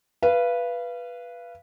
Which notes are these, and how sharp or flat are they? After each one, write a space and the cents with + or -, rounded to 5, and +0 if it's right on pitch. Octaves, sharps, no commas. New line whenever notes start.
B4 -10 F5 -30